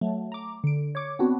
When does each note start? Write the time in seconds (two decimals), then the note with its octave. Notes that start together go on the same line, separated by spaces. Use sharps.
0.01 F#3 A3
0.32 A#5 D6
0.64 D3 D7
0.95 C#5 D6
1.19 B3 C4 D4 F#4